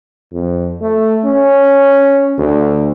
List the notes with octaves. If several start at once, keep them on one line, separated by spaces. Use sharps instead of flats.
F2
A3
C#4
D2